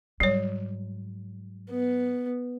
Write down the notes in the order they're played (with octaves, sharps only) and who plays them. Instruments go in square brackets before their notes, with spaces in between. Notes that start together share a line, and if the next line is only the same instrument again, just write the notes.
[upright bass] G#2 F#3 [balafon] G3 C#5
[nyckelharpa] B3